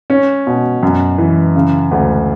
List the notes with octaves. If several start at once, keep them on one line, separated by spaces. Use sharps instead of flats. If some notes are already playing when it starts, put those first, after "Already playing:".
C#4
B2
F#2
E3
C#3
D2